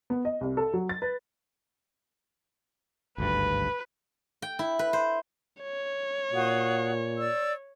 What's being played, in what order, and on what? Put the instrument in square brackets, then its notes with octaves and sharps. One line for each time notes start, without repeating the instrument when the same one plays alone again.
[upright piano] B3
D#5
C2
A4
F#3
A6
B4
[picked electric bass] G#1 D2 G2 [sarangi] B4
[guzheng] G5
E4
B4
C5
[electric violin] C#5
[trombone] A#2 [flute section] F#4 F5 D#6
[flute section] D5 E6